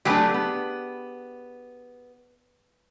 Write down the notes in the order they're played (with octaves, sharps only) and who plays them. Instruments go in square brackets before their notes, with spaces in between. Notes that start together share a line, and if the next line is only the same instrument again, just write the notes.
[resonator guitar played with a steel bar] F#3 A3 D4 [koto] G4 G#4 B4
[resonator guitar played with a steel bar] B3